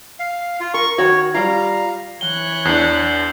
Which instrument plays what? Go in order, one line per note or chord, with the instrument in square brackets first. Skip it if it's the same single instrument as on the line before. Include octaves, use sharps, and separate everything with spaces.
[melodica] F5
F4
[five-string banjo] A#4 [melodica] C#6
[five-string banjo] D#3 F#4 [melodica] C#5
[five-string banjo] G3 F4 [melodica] F5 A#5
[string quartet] E3 C#5 F#6 [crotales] G7
[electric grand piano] E2 D4 [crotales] G6 C7 F#7